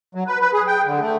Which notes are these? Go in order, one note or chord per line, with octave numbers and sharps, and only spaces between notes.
F#3
B4
B4
G#4
G5
D3
A3